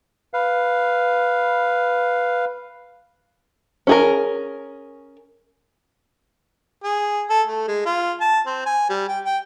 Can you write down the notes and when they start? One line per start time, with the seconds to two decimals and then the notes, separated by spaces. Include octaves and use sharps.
0.34 B4 F5
3.87 C#4 G#4 A#4
6.84 G#4
7.29 A4
7.47 A3
7.67 G#3
7.85 F4
8.21 A5
8.46 C4
8.66 G#5
8.90 G3
9.08 G5
9.24 G5